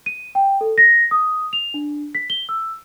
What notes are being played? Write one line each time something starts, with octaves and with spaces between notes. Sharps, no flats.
D#7
G5
A4
A#6
D#6
F7
D4
B6
G7
E6